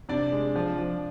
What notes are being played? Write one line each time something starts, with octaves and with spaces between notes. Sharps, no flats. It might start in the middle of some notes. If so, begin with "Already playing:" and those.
C3 D4 D5
G#3
F3
F3